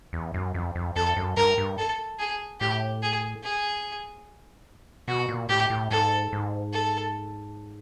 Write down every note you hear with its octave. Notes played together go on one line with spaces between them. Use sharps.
E2
F#2
F2
F2
F2 A4
F#2
G2 A#4
G2
A4
G#4
A2 G4
G#4
G#4
B2 F#4
A#2
A2 G4
A2
G#2 A4
G#2
A4